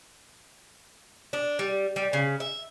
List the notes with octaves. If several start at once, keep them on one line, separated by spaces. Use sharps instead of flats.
D4
G3
G3
C#3
E5